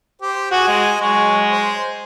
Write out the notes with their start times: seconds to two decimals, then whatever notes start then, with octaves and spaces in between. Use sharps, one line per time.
0.22 G4 C5
0.52 F#4 G#4
0.68 G#3
1.01 F#3 G#3 F#4 C#5
1.50 C5